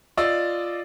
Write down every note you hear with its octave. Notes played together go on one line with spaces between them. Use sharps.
F4 D5 D#5 E6